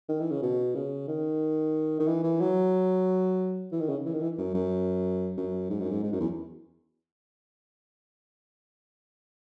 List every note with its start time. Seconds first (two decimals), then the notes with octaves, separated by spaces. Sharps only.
0.09 D#3
0.20 E3
0.32 C#3
0.43 B2
0.75 C#3
1.08 D#3
2.00 D#3
2.08 E3
2.24 E3
2.41 F#3
3.72 E3
3.81 D#3
3.89 C#3
4.06 E3
4.14 D#3
4.21 E3
4.38 F#2
4.54 F#2
5.38 F#2
5.70 G#2
5.80 F#2
5.90 G#2
6.03 G#2
6.12 F#2
6.20 E2